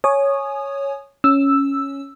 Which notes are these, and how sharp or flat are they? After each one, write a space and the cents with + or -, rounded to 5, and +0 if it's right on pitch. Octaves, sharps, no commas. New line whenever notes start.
C#5 +0 G#5 +15 D#6 -20
C#4 +0 E6 +0